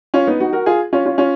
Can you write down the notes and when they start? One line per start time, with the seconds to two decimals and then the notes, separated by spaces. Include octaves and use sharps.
0.14 C#4 F4
0.27 B3 D#4
0.40 D#4 F#4
0.53 F#4 A#4
0.66 F4 G#4
0.93 C#4 F4
1.05 C#4 F4
1.18 C#4 F4